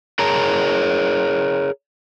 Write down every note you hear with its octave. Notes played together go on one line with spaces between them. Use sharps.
G#4 A#4 C#5 A#5